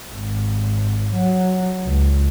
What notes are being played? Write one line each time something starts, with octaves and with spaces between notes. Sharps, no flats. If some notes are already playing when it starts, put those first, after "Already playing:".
G#1
F#3
C#2